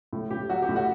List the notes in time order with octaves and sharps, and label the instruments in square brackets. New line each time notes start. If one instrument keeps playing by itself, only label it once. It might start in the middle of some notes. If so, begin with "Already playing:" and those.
[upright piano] A2
A2 G4
F#3 F#4
G4
A2
F#4